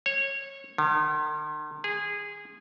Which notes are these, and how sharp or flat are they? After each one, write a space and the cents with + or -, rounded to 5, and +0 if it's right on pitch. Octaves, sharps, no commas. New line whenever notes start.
C#5 -20
D#3 -45
G#4 -20